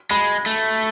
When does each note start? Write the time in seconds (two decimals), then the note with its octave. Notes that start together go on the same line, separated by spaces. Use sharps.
0.11 G#3 B5
0.46 A3